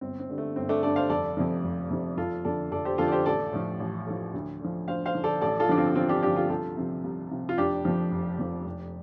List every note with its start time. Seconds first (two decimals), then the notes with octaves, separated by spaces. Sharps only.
0.01 G1 C4
0.20 C4
0.29 G2 D3
0.38 A3
0.56 G1 C4
0.69 A3 D4
0.83 G2 D3 A4 D5
0.96 C5 F5
1.10 F1 A4 D5
1.37 F2 C3 F3
1.64 F1
1.90 F2 C3 F3
2.17 F1 F4 A4
2.44 F2 D3 A4 D5
2.72 F1 A4 D5
2.85 G4 C5
2.98 F2 D3 F4 A4
3.08 D5
3.12 G4 C5
3.26 A1 A4 D5
3.53 A2 F3
3.80 A1
4.07 A2 F3
4.34 D2
4.60 D3 F3
4.88 D2 C5 F5
5.05 C5 F5
5.15 D3 F3
5.24 A4 D5
5.41 A1 A4 D5
5.60 F4 A4
5.69 G2 D3 F3 D4
5.78 C4 F4
5.95 A1 C4 F4
6.09 D4 G4
6.22 G2 D3 F3 D4 G4
6.36 F4 A4
6.50 C2 F4 A4
6.77 C3 F3
7.04 C2
7.31 C3 F3
7.49 F4
7.58 F1 D4 G4
7.85 F2 F3
8.11 F1
8.39 F2 F3
8.66 F1